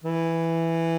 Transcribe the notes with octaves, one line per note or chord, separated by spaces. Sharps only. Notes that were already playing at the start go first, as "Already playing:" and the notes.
E3